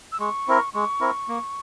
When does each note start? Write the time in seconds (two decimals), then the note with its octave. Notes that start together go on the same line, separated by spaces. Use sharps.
0.12 E6
0.19 G#3 C#6
0.48 C4 E4 A#4
0.74 G#3 C#6
1.01 C4 E4 A#4
1.29 A#3